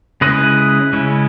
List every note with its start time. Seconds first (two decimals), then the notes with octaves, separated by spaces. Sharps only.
0.21 C#3 G#3 C#4 E4 B4 D#5
0.93 C#3 G#3 C#4 E4